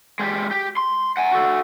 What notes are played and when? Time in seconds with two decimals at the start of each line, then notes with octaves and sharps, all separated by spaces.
0.19 G#3 G4
0.51 G4
0.77 C6
1.17 F#5 G#5
1.32 F#4 A4